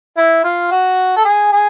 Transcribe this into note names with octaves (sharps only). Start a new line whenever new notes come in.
E4
F4
F#4
A4
G#4
G#4